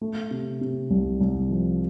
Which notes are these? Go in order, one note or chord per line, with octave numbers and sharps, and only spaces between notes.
A3
C3
C3
C2
C2
F3